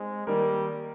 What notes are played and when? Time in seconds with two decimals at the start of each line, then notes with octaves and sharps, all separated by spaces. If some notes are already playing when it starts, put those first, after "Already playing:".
Already playing: G#3 C4 D#4
0.27 D#3 G3 A#3 D#4 A#4